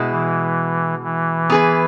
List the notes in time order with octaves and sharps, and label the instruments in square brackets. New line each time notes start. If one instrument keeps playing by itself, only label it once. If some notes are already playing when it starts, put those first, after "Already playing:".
Already playing: [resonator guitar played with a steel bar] B2 G#3 E4
[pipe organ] E3
E3
[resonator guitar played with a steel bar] B3 G#4 B4